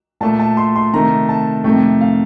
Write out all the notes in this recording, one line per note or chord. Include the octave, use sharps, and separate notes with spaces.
A#2 A3 A5
A5
C6
C6
C3 D#3 A3 A#5
A5
F2 C3 D#3 A3 G5
F5